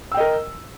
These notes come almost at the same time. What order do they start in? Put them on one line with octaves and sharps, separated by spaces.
E6 G5 D#5 A#4